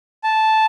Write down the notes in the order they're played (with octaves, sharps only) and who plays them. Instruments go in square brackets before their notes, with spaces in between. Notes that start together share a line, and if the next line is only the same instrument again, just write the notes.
[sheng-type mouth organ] A5